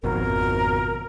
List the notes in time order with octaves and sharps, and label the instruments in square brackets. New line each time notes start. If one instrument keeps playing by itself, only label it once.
[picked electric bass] G#1 F2 B2 [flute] A#4